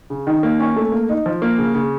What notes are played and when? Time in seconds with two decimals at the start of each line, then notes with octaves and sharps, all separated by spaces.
0.10 C#3
0.27 D#3
0.43 A#3
0.60 C#4
0.76 A3
0.92 A#3
1.09 D#4
1.26 F3
1.42 A#3
1.58 C#3
1.75 C#3